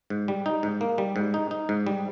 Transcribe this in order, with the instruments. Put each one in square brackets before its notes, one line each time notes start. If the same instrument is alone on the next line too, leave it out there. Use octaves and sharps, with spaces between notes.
[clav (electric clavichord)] G#2
G3
D#4
G#2
A#3
G3
G#2
D#4
D#4
G#2
G3